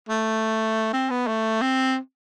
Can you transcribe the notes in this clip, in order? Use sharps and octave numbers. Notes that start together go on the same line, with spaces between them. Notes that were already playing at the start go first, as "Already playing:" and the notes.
A3
C4
B3
A3
C4